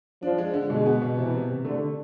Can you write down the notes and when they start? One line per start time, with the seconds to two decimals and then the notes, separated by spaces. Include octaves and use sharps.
0.22 F3 D4
0.38 G#3
0.54 D3
0.70 B2 G#3
0.86 B3
1.02 B2
1.17 C3 E3
1.33 C3
1.49 C3
1.65 D3 A3